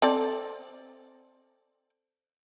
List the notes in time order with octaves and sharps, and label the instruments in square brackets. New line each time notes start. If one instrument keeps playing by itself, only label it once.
[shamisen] C4 A4 D5